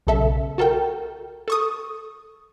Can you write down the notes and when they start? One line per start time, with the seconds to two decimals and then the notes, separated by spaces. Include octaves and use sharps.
0.07 B1 C#3 A4 E5
0.58 F#4 A4 A#4 G5
1.48 A4 C#6 D#6